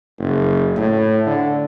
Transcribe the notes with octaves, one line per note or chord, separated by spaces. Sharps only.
F#1
A2
D3